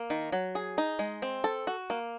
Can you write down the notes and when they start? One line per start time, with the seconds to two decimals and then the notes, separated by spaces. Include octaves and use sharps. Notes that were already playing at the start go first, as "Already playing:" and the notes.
Already playing: A#3
0.10 D#3
0.32 F#3
0.55 G#4
0.78 D#4
0.99 G#3
1.22 C4
1.44 A4
1.67 F#4
1.90 A#3